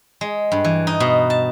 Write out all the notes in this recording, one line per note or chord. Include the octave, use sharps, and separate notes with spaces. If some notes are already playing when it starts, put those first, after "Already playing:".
G#3
G2
E3
D#4
B2
A5